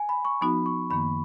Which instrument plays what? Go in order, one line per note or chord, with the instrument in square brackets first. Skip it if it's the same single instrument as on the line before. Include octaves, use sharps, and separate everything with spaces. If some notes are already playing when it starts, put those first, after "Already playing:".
Already playing: [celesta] G#5
B5
C#6
[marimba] F3 B3 D#4 F#4 [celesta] B5
[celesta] C#6
[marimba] F#2 D#3 A#3 [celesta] B5